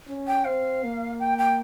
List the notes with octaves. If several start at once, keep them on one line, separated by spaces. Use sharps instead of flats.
C#4
G5
C4 F5
A#3
G5
G5